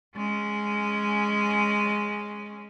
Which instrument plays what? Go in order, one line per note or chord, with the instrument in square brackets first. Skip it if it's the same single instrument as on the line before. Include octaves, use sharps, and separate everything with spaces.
[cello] G#3 C#4